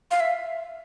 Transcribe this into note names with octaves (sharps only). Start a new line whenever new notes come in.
F5
E5